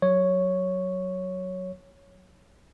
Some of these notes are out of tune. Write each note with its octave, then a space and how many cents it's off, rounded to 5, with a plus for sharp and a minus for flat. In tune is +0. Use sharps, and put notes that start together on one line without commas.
F#3 +0 C#5 +0